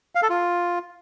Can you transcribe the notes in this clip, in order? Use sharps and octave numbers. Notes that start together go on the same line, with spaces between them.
F5
A4
F4